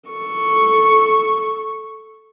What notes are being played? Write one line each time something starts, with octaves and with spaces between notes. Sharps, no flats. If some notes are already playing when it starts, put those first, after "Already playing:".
A4 C#6